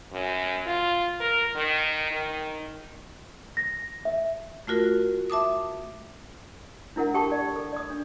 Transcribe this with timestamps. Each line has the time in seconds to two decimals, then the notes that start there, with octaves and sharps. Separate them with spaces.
0.13 F#2
0.66 F4
1.20 A#4
1.55 D#3
2.11 D#3
3.57 A#6
4.05 E5
4.67 A3 F4 F#4 A#4
5.30 E5 A5 D6 D#6
6.96 D4 E4 A#4 F#5
7.14 G4 A4 G5 A5 C#6
7.32 D5
7.56 A4
7.73 D5 D#6
7.90 D4